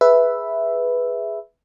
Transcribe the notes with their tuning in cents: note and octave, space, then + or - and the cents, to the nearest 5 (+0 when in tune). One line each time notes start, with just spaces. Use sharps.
G#4 +0 B4 +0 E5 +0